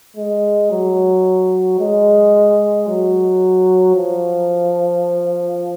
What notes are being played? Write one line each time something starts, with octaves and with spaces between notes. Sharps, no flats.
G#3
F#3
G#3
F#3
F3